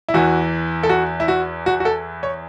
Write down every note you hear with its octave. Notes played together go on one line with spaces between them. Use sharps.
E4
E2 E3 F#4
A4
F#4
E4
F#4
F#4
F#4
A4
C#5